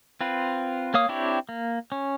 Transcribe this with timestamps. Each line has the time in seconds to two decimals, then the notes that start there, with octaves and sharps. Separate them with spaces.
0.21 C4 F4 B4
0.94 A#3 C#5 F5 D#6
1.09 C4 D4 E4 G4 C#5
1.49 A#3
1.92 C#4